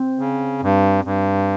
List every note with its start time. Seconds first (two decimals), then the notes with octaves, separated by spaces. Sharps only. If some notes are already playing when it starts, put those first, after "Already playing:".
Already playing: C4
0.19 C#3
0.62 G2
1.04 G2